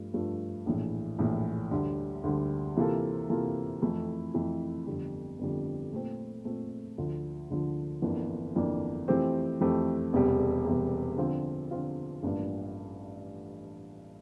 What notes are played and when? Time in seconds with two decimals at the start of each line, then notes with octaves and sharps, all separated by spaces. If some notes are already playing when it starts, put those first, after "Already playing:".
Already playing: G2 F3 A3
0.14 G2 F3 A3
0.66 A#1 A2 E3
1.19 A#1 A2 E3
1.71 D2 D3 G3
2.23 D2 D3 G3
2.76 C3 E3 A#3 F4 A4
3.29 C3 E3 A#3 F4 A4
3.82 F2 E3 A3 E4
4.34 F2 E3 A3 E4
4.86 G1 F2 D3 G3
5.39 G1 F2 D3 G3
5.93 A#2 A3 C4
6.45 A#2 A3 C4
6.98 D2 D3 F3
7.50 D2 D3 F3
8.02 G1 F2 E3 A#3 D4
8.55 G1 F2 E3 A#3 D4
9.08 F2 E3 A3 C4 G4
9.61 F2 E3 A3 C4 G4
10.13 E1 E2 C3 G3
10.66 E1 E2 C3 G3
11.17 D3 F3 C4 F4
11.71 D3 F3 C4 F4
12.23 A1 G2 F3 A#3 D4